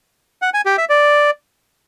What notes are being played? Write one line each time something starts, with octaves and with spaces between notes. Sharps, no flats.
F#5
G#5
G4
E5
D5